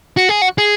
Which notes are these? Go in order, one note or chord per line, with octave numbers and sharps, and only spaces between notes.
F#4
G#4
F#4
G#4